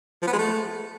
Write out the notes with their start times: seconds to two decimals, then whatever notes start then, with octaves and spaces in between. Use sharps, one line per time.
0.22 F3
0.28 B3
0.33 G#3
0.38 A3